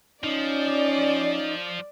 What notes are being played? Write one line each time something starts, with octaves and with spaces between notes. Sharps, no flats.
F3 C#4 D#4 D5